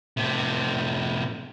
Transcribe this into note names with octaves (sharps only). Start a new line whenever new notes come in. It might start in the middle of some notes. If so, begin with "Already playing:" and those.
A2 C3